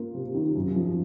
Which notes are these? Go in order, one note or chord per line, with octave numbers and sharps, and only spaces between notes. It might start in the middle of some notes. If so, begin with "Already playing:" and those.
Already playing: A#3 F4
C3
D#3
F#2
F3